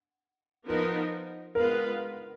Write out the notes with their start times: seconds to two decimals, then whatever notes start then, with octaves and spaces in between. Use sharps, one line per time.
0.66 F3 B3 D#4 A#4
1.55 G#3 B3 F4 A#4 B4 F5